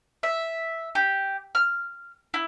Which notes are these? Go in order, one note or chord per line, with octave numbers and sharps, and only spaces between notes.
E5
G4
F6
E4